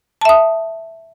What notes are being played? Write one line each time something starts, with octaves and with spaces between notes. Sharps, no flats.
E5 A5 D#6